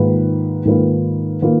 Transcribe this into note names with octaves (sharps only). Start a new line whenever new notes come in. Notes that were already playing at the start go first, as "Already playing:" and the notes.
Already playing: G#2 D#3 A#3 F4 B4
G#2 D#3 A#3 F4 B4
D#3 A#3 F4 B4